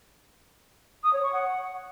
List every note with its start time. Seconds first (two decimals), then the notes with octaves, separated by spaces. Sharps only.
1.04 D#6
1.13 C#5
1.23 C#6
1.33 F#5